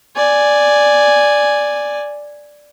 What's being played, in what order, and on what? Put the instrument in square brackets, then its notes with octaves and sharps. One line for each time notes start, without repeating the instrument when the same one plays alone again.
[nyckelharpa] D5 G#5